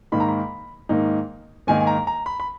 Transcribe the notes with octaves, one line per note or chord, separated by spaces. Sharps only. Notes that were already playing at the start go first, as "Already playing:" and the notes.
G#2 D#3 A#3 D#4 B5
A#5
B5
G#2 D#3 A#3 D#4
G#2 D#3 A#3 D#4 G#5
G#5
A#5
A#5
B5
B5